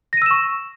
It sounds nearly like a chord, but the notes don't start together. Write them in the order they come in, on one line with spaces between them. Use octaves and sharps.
A#6 D#7 E6 E7 C#6